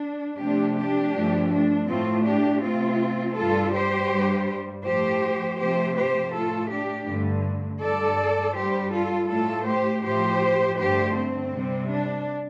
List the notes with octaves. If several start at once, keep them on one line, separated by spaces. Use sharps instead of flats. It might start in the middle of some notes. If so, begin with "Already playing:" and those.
Already playing: D4
C3 F3 A3 D4 G4
D4 G4
G2 F3 A3
D4
A2 A3 C4 F4
D4 G4
C3 A3 C4 F4
G2 G3 F4 A4
G4 C5
G2 G3
A2 F3 A3 G4 C5
C3 F3 A3 G4 C5
G4 C5
A2 A3 F4 A4
D4 G4
G2 D3 A3
G2 G3 A4 D5
G2 G3 G4 C5
F4 A4
A2 A3 F4 A4
G4 C5
A2 F3 A3 G4 C5
G2 D3 A3 G4 C5
C4
C3 G3
D4